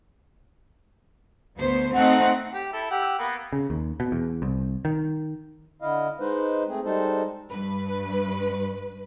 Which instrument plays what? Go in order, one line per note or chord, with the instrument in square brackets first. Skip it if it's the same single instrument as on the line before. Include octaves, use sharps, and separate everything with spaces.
[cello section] D2 B3 C5
[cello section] A3 C4 D#4 [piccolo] F#5
[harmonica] G4
E4 A4
G4 F#5 E6
A#3 B3
[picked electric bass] C#3
D#2
B2
E2
C2
D#3
[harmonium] D3 E4 D#5 F5
G#3 D#4 B4 C5
A3 C4 G#4
G3 G#3 D#4 A4 C5
[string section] G2 B4